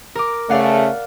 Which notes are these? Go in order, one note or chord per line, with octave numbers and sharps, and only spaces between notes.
A#4 D6
C#3 A3 D5 F5 F#5